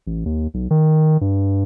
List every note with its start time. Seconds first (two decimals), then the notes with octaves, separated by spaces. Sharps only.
0.07 A1
0.26 D#2
0.54 B1
0.71 D#3
1.21 G2